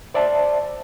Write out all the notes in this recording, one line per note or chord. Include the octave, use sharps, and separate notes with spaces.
C5 D5 E5 A5